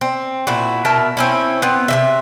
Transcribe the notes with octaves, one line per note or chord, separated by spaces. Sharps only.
C4
A#2 E4 F#4
B2 A#4 E5 A5
C4 C#4 E4
B3 C4
C3 E3 E5